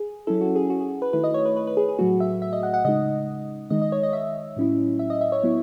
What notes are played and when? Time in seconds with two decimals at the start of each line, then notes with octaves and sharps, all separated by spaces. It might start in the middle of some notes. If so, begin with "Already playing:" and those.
Already playing: G#4
0.27 F#3 C#4 E4 A4
0.41 F#4
0.56 G#4
0.70 F#4
0.81 G#4
1.02 B4
1.13 D#3 A3 E4 B4
1.24 D#5
1.34 C#5
1.45 B4
1.57 B4
1.67 B4
1.77 G#4
1.89 G#4
1.99 A2 F#3 A3 F#4
2.20 E5
2.42 E5
2.53 D#5
2.63 F#5
2.74 F#5
2.85 C#3 G#3 D#4 D#5
3.70 D#3 G#3 D#4 D#5
3.82 D#5
3.92 C#5
4.03 D#5
4.13 E5
4.56 A2 F#3 C#4 E4
4.99 E5
5.10 D#5
5.21 E5
5.32 C#5
5.43 F#3 B3 E4